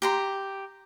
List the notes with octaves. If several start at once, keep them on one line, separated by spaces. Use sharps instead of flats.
G4 A#5 C6